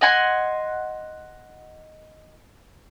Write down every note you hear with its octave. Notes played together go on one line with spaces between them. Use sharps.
D#5 F#5 G#5 C6